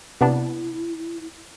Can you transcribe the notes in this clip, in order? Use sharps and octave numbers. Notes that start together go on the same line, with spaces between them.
C3 B3 D4 E4